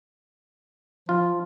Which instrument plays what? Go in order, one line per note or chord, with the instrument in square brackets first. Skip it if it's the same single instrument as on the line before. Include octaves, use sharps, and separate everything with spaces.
[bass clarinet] F3 [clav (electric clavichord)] F4